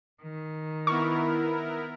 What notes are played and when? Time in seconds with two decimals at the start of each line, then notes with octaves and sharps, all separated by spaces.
0.22 D#3
0.87 B3 E4 A#4 C#6